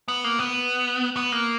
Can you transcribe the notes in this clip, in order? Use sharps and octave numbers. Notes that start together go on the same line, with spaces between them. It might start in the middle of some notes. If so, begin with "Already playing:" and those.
B3
A#3
B3
B3
A#3